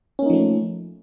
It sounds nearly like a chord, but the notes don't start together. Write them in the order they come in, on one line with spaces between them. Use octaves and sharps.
C#4 A#3 D#4 F3 A3